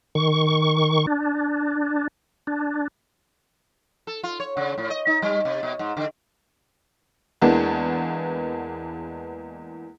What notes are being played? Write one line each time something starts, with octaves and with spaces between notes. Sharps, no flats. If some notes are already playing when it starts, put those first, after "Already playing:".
D#3 C#6
D4
D4
A4
F4
C#5
C#3
A2
D#5
D#4
G3
C3
B2
G#2
D3
E2 E3 G#3 A#3 B3 D4